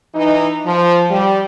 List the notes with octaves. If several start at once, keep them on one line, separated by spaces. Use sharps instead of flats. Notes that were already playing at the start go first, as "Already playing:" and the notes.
E3 D#4
F3
G3